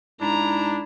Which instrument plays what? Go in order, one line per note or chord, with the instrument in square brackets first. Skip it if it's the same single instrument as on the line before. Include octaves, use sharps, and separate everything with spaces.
[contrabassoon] G#2 [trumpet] D4 [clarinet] E4 [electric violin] A#5